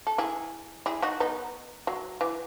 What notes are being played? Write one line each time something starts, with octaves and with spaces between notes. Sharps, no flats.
A4
E4 G#4
E4 G#4
D#4 F#4
B3 D#4
F#3
E3